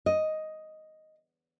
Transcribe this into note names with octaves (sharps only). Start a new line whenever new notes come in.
D#5